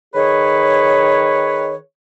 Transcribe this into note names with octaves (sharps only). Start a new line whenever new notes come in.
D#3 G#4 B4 C#5